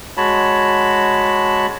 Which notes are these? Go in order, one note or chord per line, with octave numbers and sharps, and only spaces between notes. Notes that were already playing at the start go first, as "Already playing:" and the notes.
G#3 F#4 C#5 A5 B5